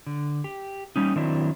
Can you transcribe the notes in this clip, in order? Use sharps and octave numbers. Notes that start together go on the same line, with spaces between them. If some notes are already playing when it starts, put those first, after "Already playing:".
D3
G4
G3 C#4 D#4
D#3 F#3 C4 D4 E4